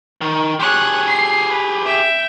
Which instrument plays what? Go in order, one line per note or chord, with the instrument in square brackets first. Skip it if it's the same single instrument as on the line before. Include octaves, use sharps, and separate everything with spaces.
[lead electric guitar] D#3
[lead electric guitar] G4 G#4 [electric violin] C#5 F#6
[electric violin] C7
B4
E5 G5